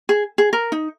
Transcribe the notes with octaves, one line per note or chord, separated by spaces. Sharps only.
G#4
G#4
A#4
D#4